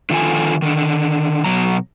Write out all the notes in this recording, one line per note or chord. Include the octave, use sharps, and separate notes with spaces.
D3 D#3 F3 F4 A4 G#5
D3 D#3
B2 F#3 A#5